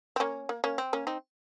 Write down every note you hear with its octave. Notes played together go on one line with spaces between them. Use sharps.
C4
A#3 C#4
A#3
A#3 C#4
C4
A#3 C#4
C4 D#4